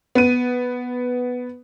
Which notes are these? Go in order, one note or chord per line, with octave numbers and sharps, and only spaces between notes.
B3 D#7